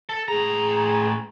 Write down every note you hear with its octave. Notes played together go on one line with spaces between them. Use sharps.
A4
A2 G#4 A#5